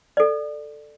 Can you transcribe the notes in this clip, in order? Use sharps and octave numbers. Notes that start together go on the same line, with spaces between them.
A4 D5